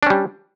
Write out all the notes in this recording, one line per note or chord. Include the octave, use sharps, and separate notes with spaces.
G3 C#4 D4